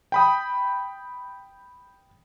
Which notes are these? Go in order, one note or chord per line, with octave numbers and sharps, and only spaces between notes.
G5 B5 D#6